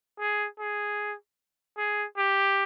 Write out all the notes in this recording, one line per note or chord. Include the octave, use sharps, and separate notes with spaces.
G#4
G#4
G#4
G4